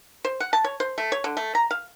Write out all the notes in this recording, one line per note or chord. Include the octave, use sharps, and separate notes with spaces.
C5
F#5
A5
C#5
C5
A3
C#5
D3
A3
A#5
F5